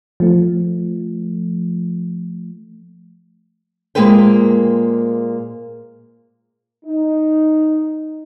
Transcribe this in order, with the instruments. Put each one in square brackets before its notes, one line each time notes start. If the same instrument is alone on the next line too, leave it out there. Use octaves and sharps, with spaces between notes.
[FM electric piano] F3 A3
[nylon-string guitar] A#2 G#3 A#3 C4 B4 G5
[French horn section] D#4